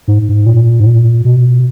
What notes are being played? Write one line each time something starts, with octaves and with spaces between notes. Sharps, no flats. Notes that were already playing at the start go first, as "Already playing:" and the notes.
G#2
G#2
A#2
G#2
A#2
B2